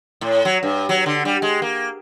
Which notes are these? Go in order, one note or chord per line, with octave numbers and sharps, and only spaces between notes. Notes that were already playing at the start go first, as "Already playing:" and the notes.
A2
F#3
G2
F#3
D3
G3
G#3
A#3